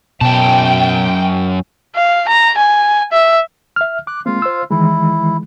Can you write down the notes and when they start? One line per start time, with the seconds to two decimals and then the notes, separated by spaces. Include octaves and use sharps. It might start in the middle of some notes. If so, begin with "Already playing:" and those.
0.21 F#2 B2 G5 A5
1.95 F5
2.28 A#5
2.57 G#5
3.12 E5
3.76 E5 F6
4.07 D6 F#6
4.26 G#3 A#3 C4 F4 F5
4.42 C5 E6
4.71 D#3 E3 G#3 E4